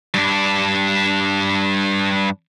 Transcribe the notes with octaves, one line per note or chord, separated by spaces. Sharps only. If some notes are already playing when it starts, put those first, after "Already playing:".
G2 D4